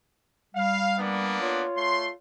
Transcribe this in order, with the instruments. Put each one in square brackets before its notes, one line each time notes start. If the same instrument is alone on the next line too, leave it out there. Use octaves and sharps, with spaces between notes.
[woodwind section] G3 [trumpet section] F5
[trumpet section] A#3 B3 D4
[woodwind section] F4 C#5
[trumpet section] A3 C6